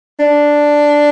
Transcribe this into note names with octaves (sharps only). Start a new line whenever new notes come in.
D4